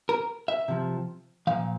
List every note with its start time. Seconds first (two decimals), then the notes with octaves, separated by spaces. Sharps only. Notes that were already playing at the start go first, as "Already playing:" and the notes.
0.09 A#4
0.48 E5
0.68 C3 F3
1.47 A#2 F3 F5